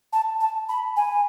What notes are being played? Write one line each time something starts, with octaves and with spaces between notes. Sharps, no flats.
A5
A5
B5
G#5